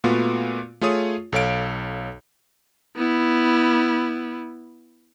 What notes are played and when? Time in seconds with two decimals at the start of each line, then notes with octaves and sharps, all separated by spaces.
0.04 A#2 A3 B3 F4 F#4
0.81 A3 F4 G#4 C#5 D#6
1.32 B1 A4 C#5 F5 D7
2.96 B3 E4